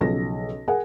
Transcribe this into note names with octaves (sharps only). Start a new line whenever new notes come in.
B1 C#3 F3 A#6
G#4 A#4 F#5 G#5